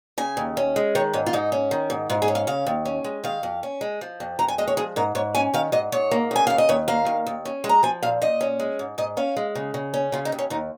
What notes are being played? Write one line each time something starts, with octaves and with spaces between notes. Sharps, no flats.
C#3 G#5
D#2
C#4
G#3
D#3 C#5
G#2 C#4
F4
G#2 D#4
C#4
D#3
G#2
G#2 F4
G#4
C#4
F5
C#3 F5
D#2
C#4
G#3
D#3 F5
F2
C#4
G#3
F3
F2
F2 A#5
G#5
G#3 D#5
C#5
F3 G#4
G#2 A#4
G#2 C#5
C#4 G#5
D#3 F5
G#2 D#5
G#2 C#5
A#3
C#3 G#5
D#2 F5
D#5
D#2 C#5
A#3 F5
D#3
D#2
C#4
G#3
A#5
F3 G#5
A#2 F5
A#2 D#5
C#4
G#3
G#2
G#2 D#5
C#4 F5
G#3
C#3
C#3
C#4
C#3 F4
D#4
D#2
C#4
D#2 D#4